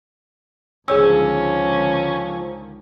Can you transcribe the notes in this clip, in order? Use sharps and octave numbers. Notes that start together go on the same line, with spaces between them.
C#2 D3 D#3 F3 C#4 G#4 C#5 E6